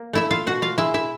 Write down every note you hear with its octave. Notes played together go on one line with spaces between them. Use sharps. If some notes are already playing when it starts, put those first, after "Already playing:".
Already playing: A#3
A3 E4 E5
F4 F5
B2 F#4 F#5
F4 F5
G#3 E4 E5
E4 E5